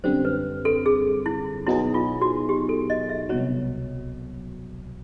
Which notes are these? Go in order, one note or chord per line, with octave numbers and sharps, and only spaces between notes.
F#2 D3 G3 C4 C5
B4
A4
G#4
E4
B2 F#3 B3 D#4 E4 G#4
F4
F#4
G4
A4
D#5
E5
C2 B2 F#3 C#5